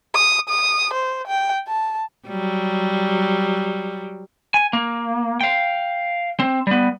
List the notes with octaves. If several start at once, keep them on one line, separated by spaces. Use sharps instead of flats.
D#6
D#6
C5
G5
A5
F#3 G3
G#5
A#3
F5 G5
C4
G3 B3